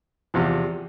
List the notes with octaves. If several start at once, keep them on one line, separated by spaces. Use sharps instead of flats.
E2 C3 F3